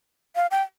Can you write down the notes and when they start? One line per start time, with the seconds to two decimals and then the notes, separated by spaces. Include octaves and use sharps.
0.36 F5
0.51 G5